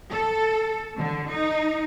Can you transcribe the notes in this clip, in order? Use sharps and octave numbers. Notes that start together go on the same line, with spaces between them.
A4
D3
D#4